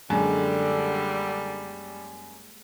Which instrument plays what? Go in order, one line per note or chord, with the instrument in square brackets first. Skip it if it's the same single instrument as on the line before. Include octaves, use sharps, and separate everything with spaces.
[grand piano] F#2 [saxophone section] D3 [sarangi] G3 [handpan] G#3 A#3